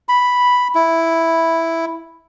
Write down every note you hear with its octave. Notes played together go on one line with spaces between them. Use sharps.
B5
E4